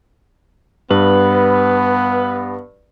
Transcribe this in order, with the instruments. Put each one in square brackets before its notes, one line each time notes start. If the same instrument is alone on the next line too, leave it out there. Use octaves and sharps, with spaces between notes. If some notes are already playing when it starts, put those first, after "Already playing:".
[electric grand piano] G2 [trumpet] B3 [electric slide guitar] B4